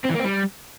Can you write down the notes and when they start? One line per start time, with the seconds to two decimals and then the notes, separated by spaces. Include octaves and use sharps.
0.04 C4
0.09 E3
0.14 A#3
0.19 C4
0.24 G3